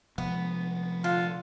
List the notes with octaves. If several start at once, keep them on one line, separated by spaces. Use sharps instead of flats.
C3 F3 G#3 B3
D3 F4